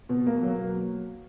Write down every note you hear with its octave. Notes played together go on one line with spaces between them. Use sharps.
B2
A#3
F#3